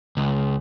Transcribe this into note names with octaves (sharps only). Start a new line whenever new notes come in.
C#2